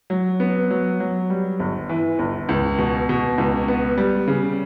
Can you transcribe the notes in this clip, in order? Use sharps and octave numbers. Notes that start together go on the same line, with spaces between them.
F#3
B3
F#3
F#3
G3
G1
E3
G1
C#2
B2
B2
C#2
B3
G3
C#3